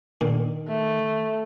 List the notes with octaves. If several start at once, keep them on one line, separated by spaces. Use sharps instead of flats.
A#2 D3 D#3
A3